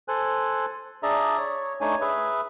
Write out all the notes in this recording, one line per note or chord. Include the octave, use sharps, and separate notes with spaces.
A4 C5 G#5 F#6
D4 G#4 D5 E5 A#5
C#5
A3 D4 D#4 C#5 G#5
G#4 B4 E5